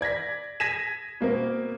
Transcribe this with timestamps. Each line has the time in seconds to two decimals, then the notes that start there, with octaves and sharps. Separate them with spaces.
0.01 D5 G#6 A#6 B6
0.60 G#6 A#6 B6 D#7 E7
1.21 B2 A#3 C4 A#4